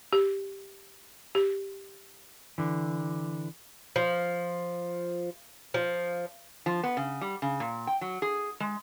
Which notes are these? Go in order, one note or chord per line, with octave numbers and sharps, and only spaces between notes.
G4
G4
D3 E3
F3
F3
F3
B3
C#3
G3
C#3
A#2
G5
F#3
G#4
G#3